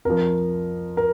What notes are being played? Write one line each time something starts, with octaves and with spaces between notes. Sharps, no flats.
F2 F3 A#4
A#4